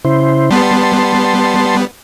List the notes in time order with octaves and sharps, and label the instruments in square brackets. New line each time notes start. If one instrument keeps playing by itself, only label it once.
[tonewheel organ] C#3 E4 C5
[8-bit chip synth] G3 B3 [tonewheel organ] A5 C6